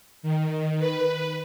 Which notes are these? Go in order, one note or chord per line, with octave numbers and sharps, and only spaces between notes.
D#3
B4